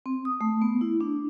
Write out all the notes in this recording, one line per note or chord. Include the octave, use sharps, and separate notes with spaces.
C4
D#6
A3
B3
E4
D4